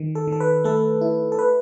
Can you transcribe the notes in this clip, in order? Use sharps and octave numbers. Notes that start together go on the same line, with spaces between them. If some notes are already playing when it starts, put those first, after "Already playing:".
Already playing: D#3
A4
D#3 A4
B4
A3 A4
E4
A4
B4